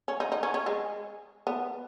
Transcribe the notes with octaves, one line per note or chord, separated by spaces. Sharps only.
C#4
D#4
D#4
C#4
C#4
G#3
B3